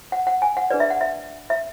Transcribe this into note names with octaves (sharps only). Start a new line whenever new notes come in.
F#5
F#5
G#5
F#5
D4 G#4 B4 D5
E5
F#5
E5
E5